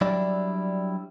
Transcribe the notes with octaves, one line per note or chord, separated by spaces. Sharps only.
F#3 G3 D4 E4 D5